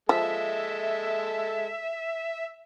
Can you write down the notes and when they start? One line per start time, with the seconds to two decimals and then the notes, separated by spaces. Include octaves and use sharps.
0.09 F3 G#3 A4 E5